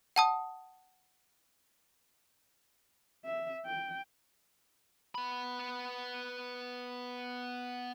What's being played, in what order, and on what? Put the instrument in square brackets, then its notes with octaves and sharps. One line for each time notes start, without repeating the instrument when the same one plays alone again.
[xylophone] F#5 A5 D#6
[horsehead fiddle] E5
G5
[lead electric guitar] B3 B5